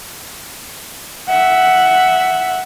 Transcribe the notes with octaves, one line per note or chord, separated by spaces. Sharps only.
E5 F#5